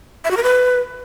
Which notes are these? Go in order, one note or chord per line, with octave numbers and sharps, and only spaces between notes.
E5
F#4
A#4
B4